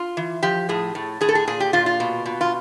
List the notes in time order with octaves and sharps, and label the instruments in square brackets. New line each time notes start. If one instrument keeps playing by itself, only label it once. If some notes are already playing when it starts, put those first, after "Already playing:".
Already playing: [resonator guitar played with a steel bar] F4
E3
F3 G4
A2 G#4
A2
A2 G#4
A4
G#4
A#2 G#4
G4
A#2 F4
F4
B2
B2
F4